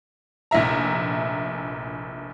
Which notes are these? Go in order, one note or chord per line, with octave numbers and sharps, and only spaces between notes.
F1 A#1 E4 E5 A#5